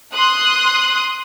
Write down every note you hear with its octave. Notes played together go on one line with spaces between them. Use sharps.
C6 D#6 F#6